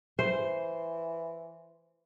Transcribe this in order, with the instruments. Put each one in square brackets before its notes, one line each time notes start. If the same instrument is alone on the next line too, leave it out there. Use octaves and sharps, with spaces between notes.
[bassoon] E3 [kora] C5